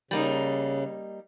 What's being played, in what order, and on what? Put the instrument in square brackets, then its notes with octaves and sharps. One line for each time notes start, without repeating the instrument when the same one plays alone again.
[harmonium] C#3 [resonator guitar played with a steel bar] G3 A#3 D#4